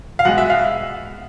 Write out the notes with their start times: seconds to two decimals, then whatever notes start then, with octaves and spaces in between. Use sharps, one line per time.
0.19 F5
0.25 B2 G#3 F#5
0.38 E5
0.50 F5